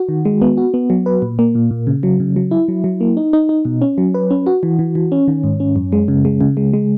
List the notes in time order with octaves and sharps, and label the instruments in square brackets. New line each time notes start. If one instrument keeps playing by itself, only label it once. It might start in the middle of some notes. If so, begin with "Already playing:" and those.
Already playing: [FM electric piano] F#4
D#3
G#3
B3
F#4
B3
F#3
B4
A#2
A#3
A#2
A#2
C#3
F#3
C#3
F#3
E4
F#3
F#3
A#3
D#4
D#4
D#4
B2
C#4
F#3
B4
C#4
F#4
E3
E3
E3
C#4
D#3
G#2
C#4
F#2
G#3
C#3
G#3
C#3
G#3
G#3